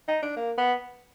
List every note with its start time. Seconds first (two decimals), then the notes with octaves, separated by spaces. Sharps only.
0.08 D#4
0.23 D4
0.36 A#3
0.58 B3